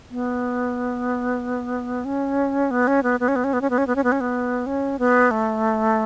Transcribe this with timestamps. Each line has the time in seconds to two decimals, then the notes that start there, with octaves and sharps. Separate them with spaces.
0.10 B3
2.05 C#4
2.71 B3
2.87 C#4
3.03 B3
3.20 B3
3.28 C#4
3.36 B3
3.44 C#4
3.53 B3
3.61 C#4
3.70 B3
3.78 C#4
3.87 B3
3.96 C#4
4.04 B3
4.12 C#4
4.20 B3
4.66 C#4
4.99 B3
5.31 A3